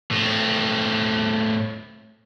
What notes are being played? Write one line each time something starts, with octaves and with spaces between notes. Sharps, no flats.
A2 C4